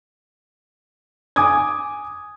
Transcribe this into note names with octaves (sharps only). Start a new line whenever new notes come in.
G#5 D6 D#6 G#6